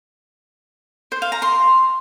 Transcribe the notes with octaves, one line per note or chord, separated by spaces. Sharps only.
C5
F5
A#5
C6